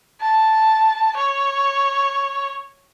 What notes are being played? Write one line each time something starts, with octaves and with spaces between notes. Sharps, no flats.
A5
C#5